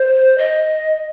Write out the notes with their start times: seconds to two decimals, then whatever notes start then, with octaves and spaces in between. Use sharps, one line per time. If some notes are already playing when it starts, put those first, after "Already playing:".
Already playing: C5
0.38 D#5